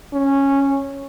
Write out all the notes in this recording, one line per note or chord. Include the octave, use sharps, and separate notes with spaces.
C#4